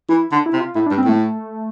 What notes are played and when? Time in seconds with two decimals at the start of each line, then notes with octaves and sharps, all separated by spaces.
0.09 E3 E4
0.32 D3
0.46 E4
0.53 C3
0.60 F4
0.75 A2 E4
0.86 D4
0.91 G2
0.98 C4
1.05 A2 A3